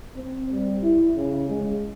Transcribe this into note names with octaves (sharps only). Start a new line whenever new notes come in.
C4
G3
E4
C#3
G#3